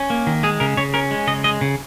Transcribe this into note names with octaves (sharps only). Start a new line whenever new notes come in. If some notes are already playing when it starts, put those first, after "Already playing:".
Already playing: C#4
A#3
D#3
G#3 G#4
C#3 A#4
C#3 C#5
C#4 A#4
G#3
C#3 D#5
G#3 D#5
C#3